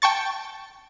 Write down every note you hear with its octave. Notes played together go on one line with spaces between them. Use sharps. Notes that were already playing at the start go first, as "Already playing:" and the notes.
G5 A5 C#6 A6